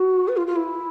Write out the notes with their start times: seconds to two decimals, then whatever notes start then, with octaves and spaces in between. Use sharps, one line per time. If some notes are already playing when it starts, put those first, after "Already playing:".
Already playing: F#4
0.28 B4
0.37 F4
0.47 F4
0.56 E4